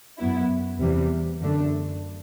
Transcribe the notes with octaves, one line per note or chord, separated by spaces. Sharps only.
F#2 F#3 B3 E4
E2 C3 E3 G3
F#2 D3 A3 D4